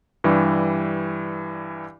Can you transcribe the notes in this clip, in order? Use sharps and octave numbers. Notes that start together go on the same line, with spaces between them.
G2 E3 G3